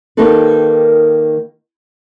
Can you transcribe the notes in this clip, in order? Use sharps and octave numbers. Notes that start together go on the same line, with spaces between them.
D#3 A#3 D#4 G4 A4 B4